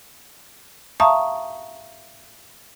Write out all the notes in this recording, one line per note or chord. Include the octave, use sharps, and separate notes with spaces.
E5 F5 A5 A#5 C#6 D#6